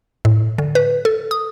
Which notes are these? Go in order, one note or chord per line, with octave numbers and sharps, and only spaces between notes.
A2
D3
B4
A4
D#6